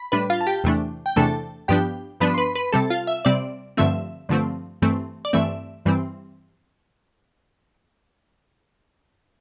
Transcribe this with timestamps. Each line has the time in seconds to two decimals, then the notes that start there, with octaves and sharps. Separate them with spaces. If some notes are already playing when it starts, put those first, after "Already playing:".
Already playing: B5
0.12 A2 G3 D4 B4 B5
0.30 F4 F5
0.41 A5
0.47 G4 G5
0.64 E2 C3 E3 A3 D4
1.06 G5
1.16 E2 C3 E3 A3 D4 A4 A5
1.68 G2 F3 B3 D4 G4 G5
2.20 G2 F3 B3 D4 B4 B5
2.34 C6
2.38 B4 B5
2.55 B4 B5
2.73 C3 G3 C4 A4 A5
2.90 F4 F5
3.07 E5
3.25 C3 G3 C4 D5
3.77 G2 D3 F3 A3 C4 E5
4.29 G2 D3 F3 A3 C4
4.82 G2 E3 A3 C4
5.25 D5
5.33 G2 E3 A3 C4 E5
5.86 G2 E3 G3 C4